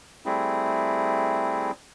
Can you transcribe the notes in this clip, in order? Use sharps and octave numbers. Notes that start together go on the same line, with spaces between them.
G3 A3 C4 E4 G#4